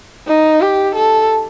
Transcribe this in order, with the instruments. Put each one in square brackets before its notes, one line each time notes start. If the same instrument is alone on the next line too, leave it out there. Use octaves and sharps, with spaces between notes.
[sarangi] D#4
G4
A4